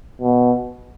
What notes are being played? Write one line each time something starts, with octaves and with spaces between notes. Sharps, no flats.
B2